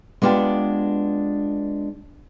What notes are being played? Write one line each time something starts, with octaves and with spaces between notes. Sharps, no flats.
G#3 B3 D4 F4 G4